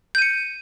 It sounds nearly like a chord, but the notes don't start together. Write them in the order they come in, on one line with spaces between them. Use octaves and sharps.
G6 D#7 C#7